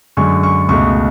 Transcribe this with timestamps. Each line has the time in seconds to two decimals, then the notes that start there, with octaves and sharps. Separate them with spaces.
0.17 F#2 D3 G#3 C#6
0.43 C#6
0.69 C#2 B2 A3 C#6